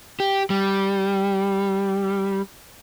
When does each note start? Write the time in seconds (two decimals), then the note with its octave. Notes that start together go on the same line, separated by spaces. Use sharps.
0.20 G4
0.50 G3